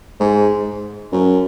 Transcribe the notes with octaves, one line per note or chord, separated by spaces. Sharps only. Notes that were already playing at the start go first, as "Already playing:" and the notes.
G#2
F#2